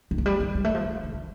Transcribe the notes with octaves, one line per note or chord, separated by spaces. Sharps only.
D#3
F3
G3
D#3
G3
A3
F3
D#3
D3
D#3